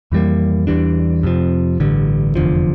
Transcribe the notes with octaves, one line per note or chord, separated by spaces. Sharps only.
F2 E3 G3 A#3
E2 E3 G3 D4
F2 C3 F3
A1 G2 D3
F1 E2 D3 F3